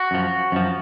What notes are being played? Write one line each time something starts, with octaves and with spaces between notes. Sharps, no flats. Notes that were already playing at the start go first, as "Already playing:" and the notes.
Already playing: F#4
F#2 F3
F#2 F3